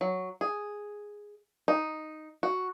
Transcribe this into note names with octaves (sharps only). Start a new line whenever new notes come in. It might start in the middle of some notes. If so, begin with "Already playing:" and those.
F#3
G#4
D#4
F#4